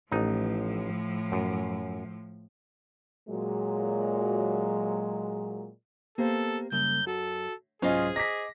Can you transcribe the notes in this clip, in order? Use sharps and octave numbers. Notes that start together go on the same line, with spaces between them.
A1 A2 F3 D#4
F#2
A#2 F#3 G#3
A#3 B3 G4 A4 C5
F#2 C#3 G3 A#3 G6
F#4 A4
C2 G#2 F#3 C#4 F4 G#4 C5 D#5
D#5 D6 A#6 B6